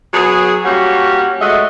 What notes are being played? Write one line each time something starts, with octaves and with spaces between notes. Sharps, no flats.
F#3 B3 G#4
G3 A#3 C#4 F#4
G#3 A3 F#4 D#5 E5